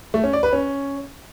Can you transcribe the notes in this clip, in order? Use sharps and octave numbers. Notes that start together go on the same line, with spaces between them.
A3
C#4
D5
B4
C#4